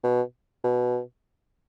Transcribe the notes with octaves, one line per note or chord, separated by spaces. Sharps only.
B2
B2